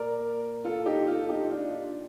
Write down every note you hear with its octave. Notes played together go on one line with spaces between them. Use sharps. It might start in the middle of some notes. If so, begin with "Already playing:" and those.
Already playing: A#2 A#4 D5
F4 A4
D#4 G4
F4 A4
D#4 G4
D4 F4